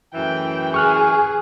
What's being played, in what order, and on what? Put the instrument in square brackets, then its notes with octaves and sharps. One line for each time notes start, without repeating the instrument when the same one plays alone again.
[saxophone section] F#2 A2 E3 [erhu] G5
[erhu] G#4 [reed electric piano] C#6 F6 F#6